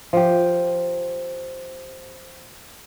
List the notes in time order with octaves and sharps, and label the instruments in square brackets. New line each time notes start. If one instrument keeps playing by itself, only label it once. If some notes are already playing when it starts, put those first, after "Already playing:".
[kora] F3 G4